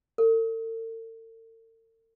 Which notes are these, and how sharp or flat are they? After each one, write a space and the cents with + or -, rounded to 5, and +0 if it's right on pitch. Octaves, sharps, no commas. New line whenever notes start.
A4 +45